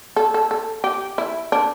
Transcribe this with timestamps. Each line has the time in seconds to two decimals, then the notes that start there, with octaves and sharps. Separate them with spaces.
0.16 A4
0.34 A4
0.51 A4
0.84 G4
1.18 E4
1.52 D4